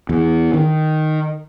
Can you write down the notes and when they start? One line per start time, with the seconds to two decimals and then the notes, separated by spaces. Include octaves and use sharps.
0.09 E2
0.54 D#3